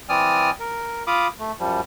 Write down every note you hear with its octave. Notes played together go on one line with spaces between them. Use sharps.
E3 C4 D5 G#5 D#6 F6
A#4
F4 F5 B5 D6 D#6
A3
F#2 F3 G3